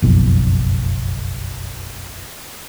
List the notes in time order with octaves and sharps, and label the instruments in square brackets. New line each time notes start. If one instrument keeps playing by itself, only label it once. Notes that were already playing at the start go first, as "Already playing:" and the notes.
[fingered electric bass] F#1 B1 F2